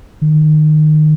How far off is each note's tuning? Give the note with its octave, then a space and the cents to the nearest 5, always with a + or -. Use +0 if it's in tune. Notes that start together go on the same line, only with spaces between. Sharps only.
D#3 -25